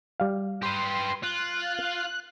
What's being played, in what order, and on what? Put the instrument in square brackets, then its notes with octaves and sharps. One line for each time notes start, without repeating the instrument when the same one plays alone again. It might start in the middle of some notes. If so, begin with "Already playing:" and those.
[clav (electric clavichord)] G3 F5
[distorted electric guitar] G4 B4 [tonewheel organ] C6
[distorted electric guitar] F4 [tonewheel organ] F#6